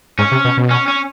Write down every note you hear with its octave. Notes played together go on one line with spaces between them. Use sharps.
G#2 C#4
C3
B2
B2
C#4
C#4